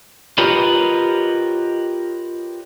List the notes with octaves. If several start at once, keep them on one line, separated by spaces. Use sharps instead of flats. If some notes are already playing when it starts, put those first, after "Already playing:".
F4 G4 A#4 B4 C#5 D#5